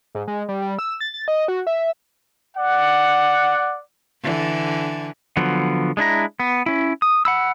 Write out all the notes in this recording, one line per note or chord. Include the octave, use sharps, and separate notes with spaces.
G#2
G#3
G3
G3
E6
A6
A6
D#5
F#4
E5
D5 F#5
D3 E3
D3 F3 F#3 B3
G#3 D4 E4 A#5
B3
C#4 E4
D#6
F#5 B5 E6